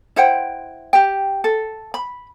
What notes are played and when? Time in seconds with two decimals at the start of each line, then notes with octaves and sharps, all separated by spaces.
0.16 E4 C5 F#5 G5
0.93 G4 G5
1.44 A4
1.94 B5